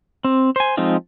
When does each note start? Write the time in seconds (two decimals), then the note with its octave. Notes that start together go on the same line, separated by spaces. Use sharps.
0.24 C4
0.56 C5 G#5
0.77 F3 G#3 C4 D#4 F4